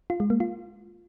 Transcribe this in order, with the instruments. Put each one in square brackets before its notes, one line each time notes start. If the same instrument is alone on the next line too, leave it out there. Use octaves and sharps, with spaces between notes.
[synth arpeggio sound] F4
G#3
A#3
F4